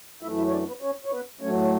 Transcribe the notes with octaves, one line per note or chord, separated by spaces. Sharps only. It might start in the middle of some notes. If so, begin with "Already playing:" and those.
F#2 E3 A3 E4 E5
E4 E5
C#5
D4 D5
B3 B4
C#4 C#5
C#5
B3 B4
A2 F#3 A3 C#4 C#5